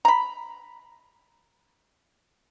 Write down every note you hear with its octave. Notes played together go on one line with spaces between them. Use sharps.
A#5 B5